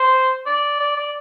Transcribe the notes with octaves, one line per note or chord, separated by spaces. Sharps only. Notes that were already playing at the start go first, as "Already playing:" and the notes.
Already playing: C5
D5
D5
D5